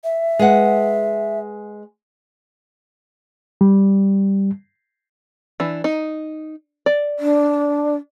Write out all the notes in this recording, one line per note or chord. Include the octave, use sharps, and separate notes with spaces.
E5
G#3 B4 F#5
G3
E3 D4
D#4
D5
D4